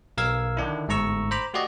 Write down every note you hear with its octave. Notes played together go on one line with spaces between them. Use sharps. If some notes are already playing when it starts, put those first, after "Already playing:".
B1 A#4 F5 E6 G#6
D3 D#3 D4 E4
G1 G#2 A3 A#5 C#6 E6
C5 A#5 B5 D6
A3 F#4 G4 D5 D#5